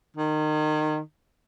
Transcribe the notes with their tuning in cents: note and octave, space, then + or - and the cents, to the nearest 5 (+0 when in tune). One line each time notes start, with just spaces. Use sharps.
D#3 -25